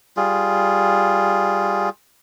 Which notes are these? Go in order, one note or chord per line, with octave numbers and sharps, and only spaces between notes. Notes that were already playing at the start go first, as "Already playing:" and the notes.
G3 F4 G#4